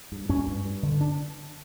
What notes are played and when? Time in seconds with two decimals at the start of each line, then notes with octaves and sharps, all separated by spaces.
0.12 G2
0.29 G2 C#4
0.47 G2
0.65 G2
0.83 D3
1.01 D4